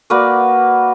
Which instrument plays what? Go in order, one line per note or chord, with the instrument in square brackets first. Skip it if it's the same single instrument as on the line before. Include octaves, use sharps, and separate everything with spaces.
[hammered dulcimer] A#3 F#4 B4 D5